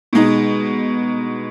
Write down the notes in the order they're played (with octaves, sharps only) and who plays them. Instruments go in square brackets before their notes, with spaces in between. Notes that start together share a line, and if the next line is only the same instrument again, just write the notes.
[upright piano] B2 G#3 D#4